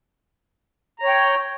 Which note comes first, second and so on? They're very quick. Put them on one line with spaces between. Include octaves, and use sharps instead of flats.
A#5 C#5 G5